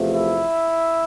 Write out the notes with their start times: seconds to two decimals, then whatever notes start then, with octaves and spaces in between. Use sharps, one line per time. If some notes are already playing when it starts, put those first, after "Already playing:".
Already playing: E2 C3 F3 A3
0.14 E4 E5